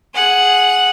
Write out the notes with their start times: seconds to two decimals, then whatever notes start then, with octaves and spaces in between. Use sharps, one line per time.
0.15 G#4 F#5